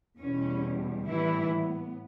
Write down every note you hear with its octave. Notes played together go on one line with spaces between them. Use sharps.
E2 B2 G3 C#4
A2 E3 G3 B3 E4